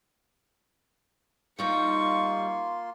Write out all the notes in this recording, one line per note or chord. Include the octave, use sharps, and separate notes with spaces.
G3 A#3 D#4 F4 C6 C#6